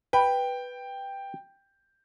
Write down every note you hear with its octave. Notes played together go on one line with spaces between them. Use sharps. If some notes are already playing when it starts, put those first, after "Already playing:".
B4 G5